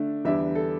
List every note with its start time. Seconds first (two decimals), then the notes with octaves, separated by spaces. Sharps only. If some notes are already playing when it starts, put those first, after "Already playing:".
Already playing: D3 A3 D4
0.25 E2 D3 G3 D4 E5
0.55 A4